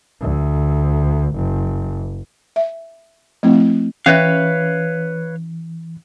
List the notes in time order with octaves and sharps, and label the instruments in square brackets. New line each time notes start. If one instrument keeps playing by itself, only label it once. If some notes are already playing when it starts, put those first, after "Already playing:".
[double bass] D2
F#1
[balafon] E5
F3 A3 C4 E4
[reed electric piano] E3 [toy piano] C#4 E5 [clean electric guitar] B4 C#5 F5